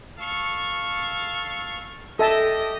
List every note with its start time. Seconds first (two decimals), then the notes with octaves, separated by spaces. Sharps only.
0.19 A4 F5 C#6
2.19 G4 A4 D#5 E5 A5